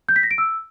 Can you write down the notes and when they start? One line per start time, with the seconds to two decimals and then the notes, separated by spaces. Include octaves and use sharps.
0.09 G6
0.16 B6
0.23 A#6
0.31 D7
0.38 E6